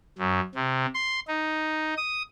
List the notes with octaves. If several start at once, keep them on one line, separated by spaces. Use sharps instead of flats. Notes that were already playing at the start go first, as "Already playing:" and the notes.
F#2
C3
C6
D#4
D#6